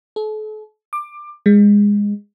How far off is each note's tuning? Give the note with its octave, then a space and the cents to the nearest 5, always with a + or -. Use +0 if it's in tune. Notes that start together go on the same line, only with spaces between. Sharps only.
A4 -40
D6 +20
G#3 -20